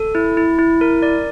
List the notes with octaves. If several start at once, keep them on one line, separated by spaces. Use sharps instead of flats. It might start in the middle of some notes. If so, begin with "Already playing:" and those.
Already playing: A4
E4
E4
E4
A#4
D5